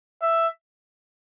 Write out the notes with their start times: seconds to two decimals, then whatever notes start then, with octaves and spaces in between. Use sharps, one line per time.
0.22 E5